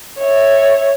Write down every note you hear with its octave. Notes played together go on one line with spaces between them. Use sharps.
C#5 E5